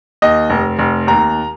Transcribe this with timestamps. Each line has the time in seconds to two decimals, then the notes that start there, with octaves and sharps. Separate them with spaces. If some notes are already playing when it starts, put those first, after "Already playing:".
0.22 D#2 D#5
0.50 F1
0.79 F1
1.07 D#2 A#5